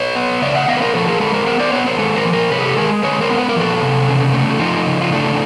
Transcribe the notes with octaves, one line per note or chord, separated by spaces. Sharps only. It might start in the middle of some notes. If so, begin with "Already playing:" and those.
Already playing: B4 C#5
B3
C#3 D5 E5
E5 F#5
B3 D#5 F5
B4
A#4 C5
F3 A4 B4
G#4 A#4
G#3 A4 B4
A#4 C5
B3 A#4 C5
C5 D5
B3 B4 C#5
A#4 C5
G#3 A4 B4
A#4 C5
F3
A#4 C5
C3 B4 C#5
G#4
G4 A4
G#3 G#4 A#4
G#3 B4 C#5
A#4 C5
B3
B4
A#4
F3 A4 B4
C3
C#3
A3
F3 D#4 F4
C#3
F4
A3 D4 E4